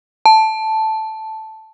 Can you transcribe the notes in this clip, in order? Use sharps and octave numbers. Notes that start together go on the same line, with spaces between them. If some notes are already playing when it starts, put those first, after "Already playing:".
A5